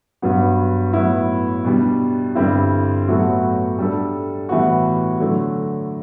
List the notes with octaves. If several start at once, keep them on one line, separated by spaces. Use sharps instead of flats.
G2 F#3 B3 F#4
A2 F#3 B3 E4
B2 G3 D4
G2 D3 G3 C4 E4
A2 F#3 B3 F#4 A4
G3 D4 A4
A2 E3 G3 B3 F#4
D3 F#3 A3